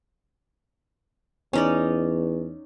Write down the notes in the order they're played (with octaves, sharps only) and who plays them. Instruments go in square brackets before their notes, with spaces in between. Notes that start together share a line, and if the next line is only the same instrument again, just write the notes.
[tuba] E2 [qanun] C#4 D#4 D5